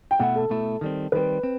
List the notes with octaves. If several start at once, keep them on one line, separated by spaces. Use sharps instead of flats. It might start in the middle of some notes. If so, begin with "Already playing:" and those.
G5
B2 A3 E4 F#5
A4
B2 A3 E4
D#3 G3 C4
D#3 G3 C4 B4
C4